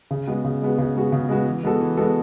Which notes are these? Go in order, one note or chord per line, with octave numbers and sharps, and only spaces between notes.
C#3
G#3 B3 F#4
C#3
G#3 B3 F#4
C#3
G#3 B3 F#4
C#3
G#3 B3 F#4
E3
G#3 B3 F#4 A4
E3
G#3 B3 F#4 A4